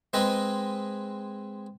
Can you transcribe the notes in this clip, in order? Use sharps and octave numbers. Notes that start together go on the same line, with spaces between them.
G#3 C4 G#4 B4 D#5